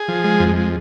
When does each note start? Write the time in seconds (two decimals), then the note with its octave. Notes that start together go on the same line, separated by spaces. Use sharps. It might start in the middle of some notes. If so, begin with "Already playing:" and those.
Already playing: G#4
0.08 F3
0.24 G#3
0.40 F2
0.56 G#3